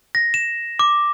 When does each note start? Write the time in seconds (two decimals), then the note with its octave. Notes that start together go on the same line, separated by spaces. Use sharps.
0.15 A#6
0.34 E7
0.79 D6